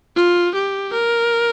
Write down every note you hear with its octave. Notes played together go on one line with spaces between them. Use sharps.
F4
G4
A#4